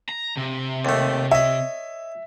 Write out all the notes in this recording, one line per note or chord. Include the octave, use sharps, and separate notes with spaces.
A#5
C3
D#2 A3
C#5 D#5 E5